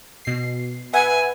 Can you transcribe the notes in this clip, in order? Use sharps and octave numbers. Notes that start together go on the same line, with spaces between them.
B2 C7
B4 E5 F#5 G#5